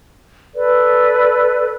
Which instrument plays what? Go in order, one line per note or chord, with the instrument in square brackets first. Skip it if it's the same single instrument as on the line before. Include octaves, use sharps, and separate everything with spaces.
[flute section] A4 B4 D5